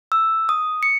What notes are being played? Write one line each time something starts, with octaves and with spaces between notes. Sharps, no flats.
E6
D#6
C#7